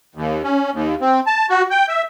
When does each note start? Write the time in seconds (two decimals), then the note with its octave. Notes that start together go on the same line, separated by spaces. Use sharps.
0.15 D#2
0.43 C#4
0.74 D#2
1.01 C4
1.26 A5
1.50 F#4
1.71 G5
1.88 E5